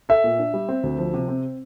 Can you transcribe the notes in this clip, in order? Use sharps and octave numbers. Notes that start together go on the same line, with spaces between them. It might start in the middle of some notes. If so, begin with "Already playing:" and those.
A4 E5
A#2
D4
G3
C4
D2
F3
C3
C4